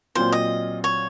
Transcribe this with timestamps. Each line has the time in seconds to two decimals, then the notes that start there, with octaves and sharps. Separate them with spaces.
0.15 A#2 F#3 C4 F4 C5
0.32 D#5
0.84 C#5